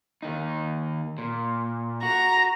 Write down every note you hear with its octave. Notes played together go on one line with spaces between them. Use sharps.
D#2 D#4
A#2
F#4 A#5